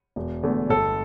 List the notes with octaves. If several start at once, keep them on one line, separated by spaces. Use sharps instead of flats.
E1
E2 D3 A3
G1 A4